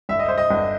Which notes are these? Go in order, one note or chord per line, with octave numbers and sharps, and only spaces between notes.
G1 E5
D#5
C5
D#5
G1